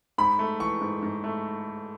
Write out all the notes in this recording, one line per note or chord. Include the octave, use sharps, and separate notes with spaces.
G#2 B5
A3
E3 C#6
G#2
G#2
A3